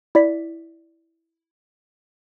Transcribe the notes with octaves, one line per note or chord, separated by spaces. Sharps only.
E4 D5 B6